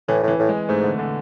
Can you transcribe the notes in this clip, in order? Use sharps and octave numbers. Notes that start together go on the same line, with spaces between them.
A2 E3
A2 E3
A2
G#3
G#2 A3
D3
D3